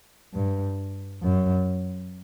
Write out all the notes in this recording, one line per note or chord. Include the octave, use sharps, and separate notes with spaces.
G2
F#2